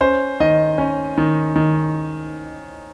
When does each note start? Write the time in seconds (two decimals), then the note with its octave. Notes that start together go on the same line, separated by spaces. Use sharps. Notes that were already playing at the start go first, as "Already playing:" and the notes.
0.01 C#4 C5
0.40 D#3 D#5
0.78 C#4
1.18 D#3
1.56 D#3